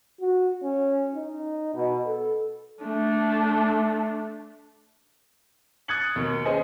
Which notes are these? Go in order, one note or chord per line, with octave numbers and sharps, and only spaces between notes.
F#4
C#4
D#4
B2
A4
A3 D4
D#6 F#6 G#6 A6 C#7 F#7
D#2 B2 D#3
C#4 G#4 B4 C5 D#5 G#5